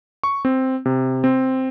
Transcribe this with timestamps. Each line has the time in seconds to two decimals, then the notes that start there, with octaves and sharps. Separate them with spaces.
0.23 C#6
0.45 C4
0.86 C3
1.24 C4